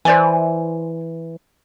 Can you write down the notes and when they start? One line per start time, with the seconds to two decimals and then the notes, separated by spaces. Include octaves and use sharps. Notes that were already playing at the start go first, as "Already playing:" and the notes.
0.05 E3 C5 D5 G#5